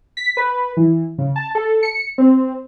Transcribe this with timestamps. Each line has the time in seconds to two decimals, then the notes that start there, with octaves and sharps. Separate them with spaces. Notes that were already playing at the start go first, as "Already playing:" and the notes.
0.17 B6
0.37 B4
0.77 E3
1.18 C#3
1.36 A5
1.55 A4
1.83 C#7
2.18 C4